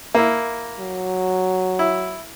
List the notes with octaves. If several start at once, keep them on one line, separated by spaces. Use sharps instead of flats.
A#3 E4
F#3
E4